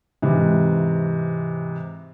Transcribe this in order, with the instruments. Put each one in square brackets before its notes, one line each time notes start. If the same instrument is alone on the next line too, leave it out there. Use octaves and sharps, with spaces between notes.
[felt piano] G#2 C3 E3